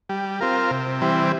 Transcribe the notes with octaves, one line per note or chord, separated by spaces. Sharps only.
G3
C4 F4 A#4
C3
E3 G3 C4